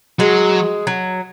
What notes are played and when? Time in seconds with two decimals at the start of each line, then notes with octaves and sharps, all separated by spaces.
0.19 F#3 G#3
0.87 F#3